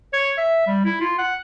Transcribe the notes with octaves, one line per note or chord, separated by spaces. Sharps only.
C#5
E5
G3
E4
F4
F#5